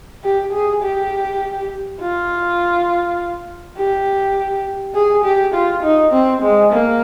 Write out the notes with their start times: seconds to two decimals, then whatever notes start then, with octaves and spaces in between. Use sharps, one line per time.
0.24 G4
0.53 G#4
0.82 G4
2.01 F4
3.77 G4
4.95 G#4
5.24 G4
5.54 F4
5.83 D#4
6.12 C4
6.42 G#3
6.72 A#3